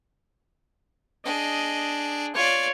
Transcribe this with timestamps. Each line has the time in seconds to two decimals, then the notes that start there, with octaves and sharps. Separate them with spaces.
1.25 D4 G#4 D#5
2.36 F4 C#5 D5